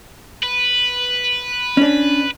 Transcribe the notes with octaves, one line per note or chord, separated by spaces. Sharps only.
B4
C#4 D4